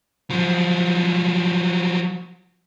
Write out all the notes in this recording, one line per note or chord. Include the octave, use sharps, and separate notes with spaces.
F3 F#3